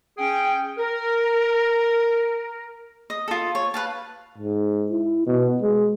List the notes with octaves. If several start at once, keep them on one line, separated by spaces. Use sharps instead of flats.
C#4 G#4 G5
A#4
D#5
F4 A4
C#5
B4 F5 A5
G#2
E4
B2
G#3